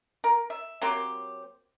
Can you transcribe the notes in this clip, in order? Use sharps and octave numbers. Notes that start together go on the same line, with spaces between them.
A#4
E5
F#3 A#3 C4 G4